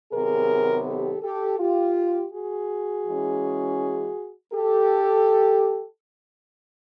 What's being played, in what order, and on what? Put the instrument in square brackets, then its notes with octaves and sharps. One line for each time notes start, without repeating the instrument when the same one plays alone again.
[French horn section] C3 D#3 F#3 B3 G#4 A#4
G4 A4
G4 A4
F4 G4
F#4 G#4
E3 G#3 C#4
G4 A4